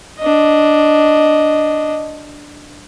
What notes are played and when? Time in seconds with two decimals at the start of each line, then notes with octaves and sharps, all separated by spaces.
0.19 D4 D#5